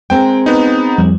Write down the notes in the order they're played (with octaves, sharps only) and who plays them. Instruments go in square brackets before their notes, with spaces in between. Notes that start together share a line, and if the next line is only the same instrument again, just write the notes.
[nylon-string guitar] G#3 C4 A#4 [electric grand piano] G5
[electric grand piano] B3 D#4
[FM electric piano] F2 F3 G3